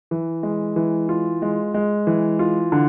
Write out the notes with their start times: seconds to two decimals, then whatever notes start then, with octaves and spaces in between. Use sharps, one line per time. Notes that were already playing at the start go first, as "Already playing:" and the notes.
0.11 E3
0.43 G#3
0.76 E3
1.09 F4
1.42 G#3
1.74 G#3
2.07 E3
2.39 F4
2.72 D3